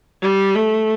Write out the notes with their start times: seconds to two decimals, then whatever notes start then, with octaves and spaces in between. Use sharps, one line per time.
0.22 G3
0.55 A3